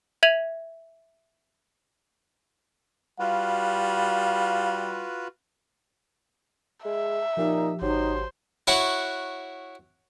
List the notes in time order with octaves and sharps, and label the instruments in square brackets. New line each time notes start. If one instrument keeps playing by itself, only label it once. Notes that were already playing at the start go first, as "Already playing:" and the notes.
[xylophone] E5 G#6 D#7 F7 F#7
[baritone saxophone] G3 [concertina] F4 F#4 B4 [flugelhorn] F5
[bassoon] G#3 [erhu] E5
[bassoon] A#2 [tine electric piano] F3 G4 [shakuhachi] D#4
[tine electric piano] G#1 G4 C6 [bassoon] F#3 [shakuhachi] D#4 [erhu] C5
[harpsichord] E4 F#4 C#5 F#5